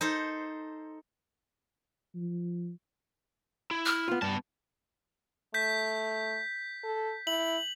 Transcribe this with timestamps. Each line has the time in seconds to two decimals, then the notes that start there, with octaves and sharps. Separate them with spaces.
0.01 D#4 A4 C5
2.15 F3
3.71 E4
3.86 F6
4.08 B3 F4
4.22 G2 B3 A5
5.54 A3 G6 B6
6.84 A4
7.27 E4 F#7